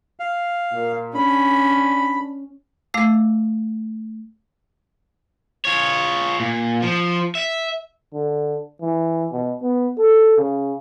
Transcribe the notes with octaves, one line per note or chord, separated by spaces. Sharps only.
F5
A#2
C#4 D4 B5
A3 F5 D6 E6
F4 C#5
A#2
F3
E5
D3
E3
B2
B3
A4
C#3